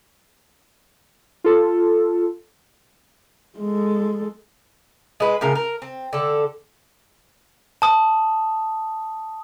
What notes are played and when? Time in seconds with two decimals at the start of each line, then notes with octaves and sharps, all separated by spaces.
1.44 F4 A4
3.58 G#3 A4
5.20 G#3 B4
5.41 A2 C#3 A#4
5.55 A#4
5.82 C4
6.13 D3 A4
7.82 A5 D#6